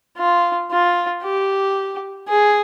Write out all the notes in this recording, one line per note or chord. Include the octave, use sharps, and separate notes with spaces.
F4
F4
G4
G#4